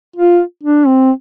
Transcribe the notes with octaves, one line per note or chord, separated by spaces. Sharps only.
F4
D4
C4